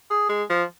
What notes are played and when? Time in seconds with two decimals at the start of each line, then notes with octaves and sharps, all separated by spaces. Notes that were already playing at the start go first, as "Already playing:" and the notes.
0.10 G#4
0.29 G#3
0.50 F3